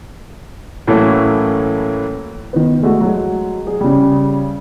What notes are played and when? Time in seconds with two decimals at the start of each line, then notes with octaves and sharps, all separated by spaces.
0.87 A2 E3 F#3 A3 A#3 C#4
2.53 D#3 B3
2.82 G#3 A3 F#4
3.01 F#3 G#3
3.67 G#4
3.81 C#3 G3